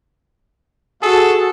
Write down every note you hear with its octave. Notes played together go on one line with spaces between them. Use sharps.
F#4 G#4 A4